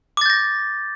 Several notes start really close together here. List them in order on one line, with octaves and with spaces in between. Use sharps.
D6 A6 G6 A#6